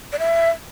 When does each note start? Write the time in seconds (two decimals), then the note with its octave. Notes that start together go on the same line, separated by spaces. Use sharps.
0.13 D5
0.19 E5